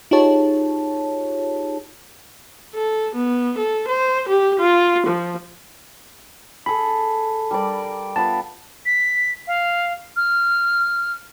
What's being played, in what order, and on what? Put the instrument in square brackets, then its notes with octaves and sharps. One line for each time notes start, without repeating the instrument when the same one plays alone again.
[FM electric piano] D#4 F4 G4 G#4 C#5 A5
[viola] A4
B3
A4
C5
G4
F4
F3
[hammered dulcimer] G#4 A4 [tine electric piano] B5
[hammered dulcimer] G3 A#4 D5
[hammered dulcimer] B3 F4 B5 [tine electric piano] A5
[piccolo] B6
F5
F6